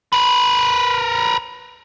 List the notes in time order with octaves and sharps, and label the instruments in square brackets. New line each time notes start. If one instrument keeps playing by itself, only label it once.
[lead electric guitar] A#4 B4